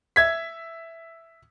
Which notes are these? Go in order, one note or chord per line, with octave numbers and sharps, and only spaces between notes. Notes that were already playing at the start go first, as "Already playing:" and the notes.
E5 G#6 B6